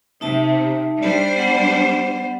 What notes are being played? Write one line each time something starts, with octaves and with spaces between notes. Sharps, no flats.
C3 D#4 E5 A5
G3 D4 C5
B3 F#5